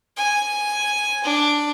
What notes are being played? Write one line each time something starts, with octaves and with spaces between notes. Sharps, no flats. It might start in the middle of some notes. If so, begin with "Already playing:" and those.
G#5
D4